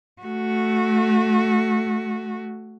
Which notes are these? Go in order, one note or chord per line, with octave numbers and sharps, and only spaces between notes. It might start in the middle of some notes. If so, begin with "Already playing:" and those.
A3 F#4